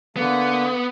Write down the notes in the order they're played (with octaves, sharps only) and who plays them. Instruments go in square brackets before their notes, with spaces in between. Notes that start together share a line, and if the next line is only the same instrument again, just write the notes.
[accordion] D3 A#3 [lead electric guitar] B3